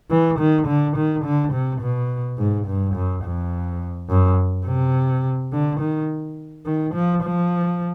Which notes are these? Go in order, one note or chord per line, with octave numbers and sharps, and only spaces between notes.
E3
D#3
D3
D#3
D3
C3
B2
G#2
G2
F#2
F2
F#2
C3
D3
D#3
D#3
F3
F3